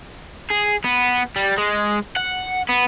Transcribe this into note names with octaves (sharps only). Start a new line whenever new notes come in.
G#4
B3
G3
G#3
F#5
B3